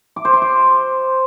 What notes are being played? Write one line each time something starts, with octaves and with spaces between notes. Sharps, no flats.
D6
C5
C6
D6